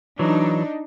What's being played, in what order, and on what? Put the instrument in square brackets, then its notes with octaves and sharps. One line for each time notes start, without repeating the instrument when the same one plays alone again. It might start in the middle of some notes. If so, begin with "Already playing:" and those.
[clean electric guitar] E3 F#3 [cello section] D4 D#4